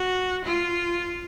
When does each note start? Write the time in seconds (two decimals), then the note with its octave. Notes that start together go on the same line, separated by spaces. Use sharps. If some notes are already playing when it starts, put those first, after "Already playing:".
Already playing: F#4
0.45 F4